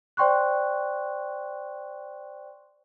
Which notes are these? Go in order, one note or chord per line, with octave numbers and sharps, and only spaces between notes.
C5 D5 G5 C6 C#6 F#6